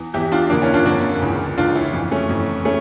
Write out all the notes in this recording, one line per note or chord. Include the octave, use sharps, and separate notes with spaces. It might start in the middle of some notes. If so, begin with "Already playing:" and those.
Already playing: E2 E3
E2 E3 E4 G4
D4 F4
F2 D3 A#3 D4
C#4 E4
D4 F4
F2 D3 A#3 D4
C#2 C#3 E3
C#2 C#3 E3 D4 F4
C#4 E4
F2 E3
A3 C#4
F2 E3
A3 C#4